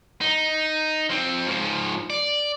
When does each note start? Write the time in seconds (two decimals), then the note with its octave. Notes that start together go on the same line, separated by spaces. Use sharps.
0.21 D#4
1.10 F3 C4
1.47 G#2 F3
2.10 D5